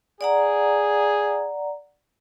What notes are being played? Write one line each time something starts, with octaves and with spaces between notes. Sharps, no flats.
G#4 D5 F#5 A#5